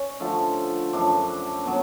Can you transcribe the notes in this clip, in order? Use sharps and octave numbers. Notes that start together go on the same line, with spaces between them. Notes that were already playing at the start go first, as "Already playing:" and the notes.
Already playing: C#4
D3 F3 A3 F4
F#2 F3 A3 D4
B2 F#3